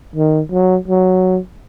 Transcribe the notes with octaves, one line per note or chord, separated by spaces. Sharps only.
D#3
F#3
F#3